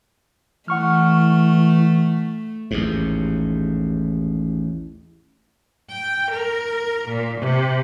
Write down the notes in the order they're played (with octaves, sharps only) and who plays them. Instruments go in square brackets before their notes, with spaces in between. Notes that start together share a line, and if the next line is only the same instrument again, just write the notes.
[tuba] E3 [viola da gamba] A3 [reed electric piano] F#5 C#6 F6
[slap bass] A1 D#2 G#2
[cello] G5
A#4
A#2
C3